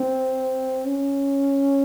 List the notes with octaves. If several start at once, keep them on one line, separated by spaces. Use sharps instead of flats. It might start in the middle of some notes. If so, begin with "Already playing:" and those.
Already playing: C4
C#4